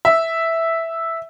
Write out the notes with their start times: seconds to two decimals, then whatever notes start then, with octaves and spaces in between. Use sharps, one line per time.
0.05 E5